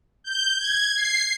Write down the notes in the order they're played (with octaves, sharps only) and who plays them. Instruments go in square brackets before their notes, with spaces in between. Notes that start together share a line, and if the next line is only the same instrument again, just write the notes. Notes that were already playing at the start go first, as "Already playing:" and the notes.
[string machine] G6
G#6
C7